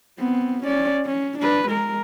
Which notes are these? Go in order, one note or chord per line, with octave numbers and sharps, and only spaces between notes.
B3 C4
C#4 D5
C#4
D4 B4
G#3 A#4